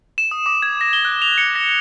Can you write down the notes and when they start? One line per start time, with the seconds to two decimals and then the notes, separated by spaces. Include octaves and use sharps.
0.18 E7
0.31 D#6
0.46 D6
0.62 G#6
0.81 A#6
0.93 G7
1.05 F#6
1.22 F7
1.38 C#7
1.55 A#6